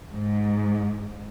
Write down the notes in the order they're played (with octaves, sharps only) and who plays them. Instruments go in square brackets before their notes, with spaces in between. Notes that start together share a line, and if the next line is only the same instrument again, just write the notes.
[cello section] G#2